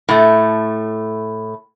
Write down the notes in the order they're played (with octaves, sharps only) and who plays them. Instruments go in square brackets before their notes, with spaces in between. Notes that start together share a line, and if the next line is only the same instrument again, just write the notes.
[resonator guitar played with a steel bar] A2 A3